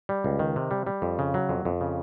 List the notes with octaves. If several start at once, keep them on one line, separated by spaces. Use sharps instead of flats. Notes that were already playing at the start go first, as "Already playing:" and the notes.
G3
C#2
D#3
C3
G3
G3
F2
C#3
F#3
F2
F2
C#3